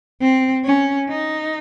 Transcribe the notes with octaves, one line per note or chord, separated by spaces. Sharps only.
C4
C#4
D#4